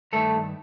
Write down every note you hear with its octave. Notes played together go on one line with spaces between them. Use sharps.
G2 D#3 A3 A4